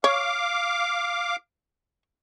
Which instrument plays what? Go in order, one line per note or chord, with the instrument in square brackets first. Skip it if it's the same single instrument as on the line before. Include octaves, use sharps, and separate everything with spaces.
[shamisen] C#5 [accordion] F5 D6